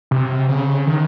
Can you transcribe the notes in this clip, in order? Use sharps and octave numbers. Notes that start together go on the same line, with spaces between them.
C3
C#3
D#3